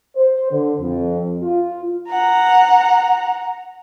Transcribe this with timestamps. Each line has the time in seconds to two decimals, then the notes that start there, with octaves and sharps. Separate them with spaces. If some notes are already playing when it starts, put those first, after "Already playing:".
0.16 C5
0.51 D3
0.80 F2
1.41 F4
2.09 F#5 A#5